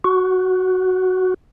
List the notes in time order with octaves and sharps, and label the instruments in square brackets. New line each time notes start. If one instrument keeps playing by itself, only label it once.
[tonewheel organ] F#4